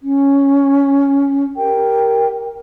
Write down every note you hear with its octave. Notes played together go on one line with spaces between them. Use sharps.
C#4
G4 A#4 G5